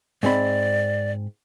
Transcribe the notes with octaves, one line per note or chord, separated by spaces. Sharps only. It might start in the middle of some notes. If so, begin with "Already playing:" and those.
G#2 C4 D5 B5